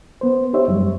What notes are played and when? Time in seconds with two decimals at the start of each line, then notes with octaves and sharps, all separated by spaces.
0.21 B3 C5
0.53 D#4 G4 C5 C#5 E5
0.68 F#2 G3 G#3